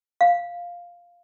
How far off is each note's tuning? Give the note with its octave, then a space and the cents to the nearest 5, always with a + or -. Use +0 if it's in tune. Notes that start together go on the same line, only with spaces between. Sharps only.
F5 +0